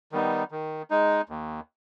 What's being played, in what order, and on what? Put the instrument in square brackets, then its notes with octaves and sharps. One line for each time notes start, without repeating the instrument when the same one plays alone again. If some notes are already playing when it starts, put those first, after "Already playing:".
[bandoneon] D#3 G3 B3 D#4
D#3
G#3 D#4
D#2